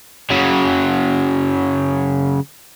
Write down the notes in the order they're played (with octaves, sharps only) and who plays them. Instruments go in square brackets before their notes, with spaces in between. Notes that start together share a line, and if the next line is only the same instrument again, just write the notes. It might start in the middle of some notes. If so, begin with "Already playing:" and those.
[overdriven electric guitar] C#3 F#3